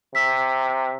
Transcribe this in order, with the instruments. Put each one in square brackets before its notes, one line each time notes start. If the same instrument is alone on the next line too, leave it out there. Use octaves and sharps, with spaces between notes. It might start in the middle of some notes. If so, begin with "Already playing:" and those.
[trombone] C3 [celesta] E6 B6